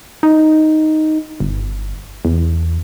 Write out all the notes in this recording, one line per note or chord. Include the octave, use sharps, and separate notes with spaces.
D#4
G1
E2